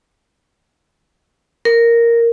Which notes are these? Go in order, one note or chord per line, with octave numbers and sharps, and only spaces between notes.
A#4